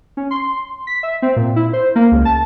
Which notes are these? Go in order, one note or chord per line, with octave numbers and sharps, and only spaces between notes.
C#4
C6
B6
E5
C4
A#2
E4
C5
A#3
C#2
A5